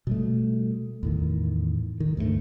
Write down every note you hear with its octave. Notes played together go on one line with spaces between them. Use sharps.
B2 G3 A3
E2 A2 D#3
D#3
D2 G2 F#3 A3